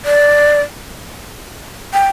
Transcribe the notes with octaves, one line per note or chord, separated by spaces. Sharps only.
D5
G5